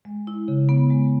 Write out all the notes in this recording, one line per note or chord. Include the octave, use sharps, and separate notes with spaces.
G#3
E4
C#3
B3
G#3